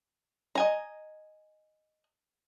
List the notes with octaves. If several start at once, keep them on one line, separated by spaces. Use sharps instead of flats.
D#5 G#5 A#5